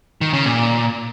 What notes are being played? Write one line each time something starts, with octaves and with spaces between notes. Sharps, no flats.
D#3
C#3
A#2